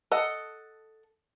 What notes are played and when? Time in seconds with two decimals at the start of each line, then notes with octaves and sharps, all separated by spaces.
0.12 A4 D#5 F#5